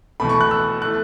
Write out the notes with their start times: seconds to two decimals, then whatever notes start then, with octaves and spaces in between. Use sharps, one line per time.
0.20 E2 B2 A3 B5
0.29 C#6
0.41 F#6
0.51 E6
0.82 E3 A3 F#6